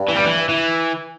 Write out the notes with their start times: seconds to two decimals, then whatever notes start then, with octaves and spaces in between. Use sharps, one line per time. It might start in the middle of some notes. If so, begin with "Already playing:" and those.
Already playing: G2
0.08 E3
0.16 G3
0.24 E3
0.49 E3